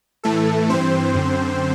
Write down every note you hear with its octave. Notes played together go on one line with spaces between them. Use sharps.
A2 E3 A3 A4
G2 E3 C4 C5
F#2 D3